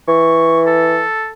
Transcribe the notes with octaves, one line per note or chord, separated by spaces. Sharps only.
E3 C#6
A4